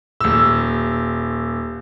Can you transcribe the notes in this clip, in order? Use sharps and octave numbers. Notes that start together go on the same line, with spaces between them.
D#1 E6